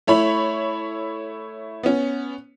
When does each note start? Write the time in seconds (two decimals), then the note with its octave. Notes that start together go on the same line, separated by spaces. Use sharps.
0.07 A3 E4 C#5 B5
1.83 B3 C#4